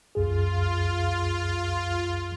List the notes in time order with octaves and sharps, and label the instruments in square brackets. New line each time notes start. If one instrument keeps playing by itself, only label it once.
[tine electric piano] C2 F#2 G#4 [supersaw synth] F4